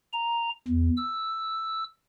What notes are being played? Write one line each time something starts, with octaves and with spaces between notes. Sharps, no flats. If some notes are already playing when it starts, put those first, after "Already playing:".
A#5
E2
E6